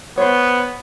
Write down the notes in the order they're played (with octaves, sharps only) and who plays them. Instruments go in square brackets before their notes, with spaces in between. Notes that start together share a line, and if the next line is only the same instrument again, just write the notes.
[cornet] B3 [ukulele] C5 C#5